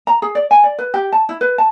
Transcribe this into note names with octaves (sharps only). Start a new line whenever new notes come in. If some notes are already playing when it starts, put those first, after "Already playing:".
A#5
G#4
D5
G#5
D5
B4
G4
A5
E4
B4
A5